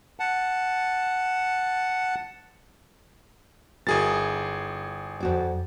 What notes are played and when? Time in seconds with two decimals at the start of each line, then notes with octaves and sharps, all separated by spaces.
0.20 F#5 A5
3.87 G1 E4 F#4 G#4 A#4 A6
5.20 F2 F#4 D5